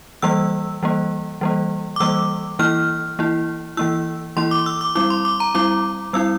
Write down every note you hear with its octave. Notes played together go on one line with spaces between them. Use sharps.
E3 G3 A#3 E6
E3 G3 A#3
E3 G3 A#3
D6
E3 G3 A#3 E6
E3 A#3 E4 F6
E3 A#3 E4
E3 A#3 E4 E6
E3 A#3 E4 C6
D6
E6
D6
G3 C4 E4 D6
C6
D6
A#5
G3 C4 E4 D6
G3 C4 E4 E6